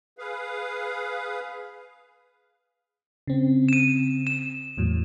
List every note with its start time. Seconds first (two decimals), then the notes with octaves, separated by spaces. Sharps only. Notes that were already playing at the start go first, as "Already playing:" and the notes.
0.18 G#4 B4 F5
3.27 C#3 C4
3.69 D#7 E7
4.27 E7
4.78 E2 A2 F#3